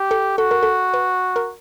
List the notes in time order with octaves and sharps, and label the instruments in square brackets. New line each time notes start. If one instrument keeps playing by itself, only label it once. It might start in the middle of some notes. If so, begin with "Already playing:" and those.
Already playing: [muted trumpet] G4
[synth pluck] A4
[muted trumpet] F#4 [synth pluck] A4
[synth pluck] A#4
A4
B4
A#4